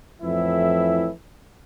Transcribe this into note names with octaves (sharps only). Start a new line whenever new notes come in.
F2 A2 E3 E4 E5